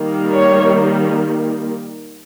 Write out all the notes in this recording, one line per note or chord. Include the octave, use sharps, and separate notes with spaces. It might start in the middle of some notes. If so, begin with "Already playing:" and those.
Already playing: D#3 G3 A#3
C#5